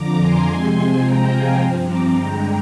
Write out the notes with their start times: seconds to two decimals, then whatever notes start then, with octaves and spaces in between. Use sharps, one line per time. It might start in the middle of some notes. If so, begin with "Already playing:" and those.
Already playing: F2 D3 F3 A#5 D6
0.18 G#5 C6
0.47 C3 F3 G#3 C4 G#5 C6
1.02 C3 F3 G#3 C4 G5 A#5
1.30 F5 G#5
1.59 G2 F3 C4
1.86 A#5 D6
2.14 G2 D3 G#3 G5 A#5